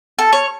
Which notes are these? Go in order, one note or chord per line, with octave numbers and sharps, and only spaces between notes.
A4
C#5